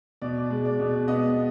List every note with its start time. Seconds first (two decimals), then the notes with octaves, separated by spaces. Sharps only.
0.22 B2 D5
0.50 G#3
0.65 D5
0.80 B2
1.08 B3 D#5